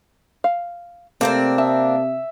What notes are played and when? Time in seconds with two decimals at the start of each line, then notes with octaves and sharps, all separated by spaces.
0.44 F5
1.21 C3 A3 A#3 C4 D4
1.58 E5 A5